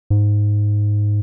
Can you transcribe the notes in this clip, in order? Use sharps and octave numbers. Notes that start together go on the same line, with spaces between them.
G#2